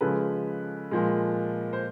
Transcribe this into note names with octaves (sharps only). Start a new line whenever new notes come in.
C#3 F3 G#3 A4 B4
A#2 F3 G#3
C5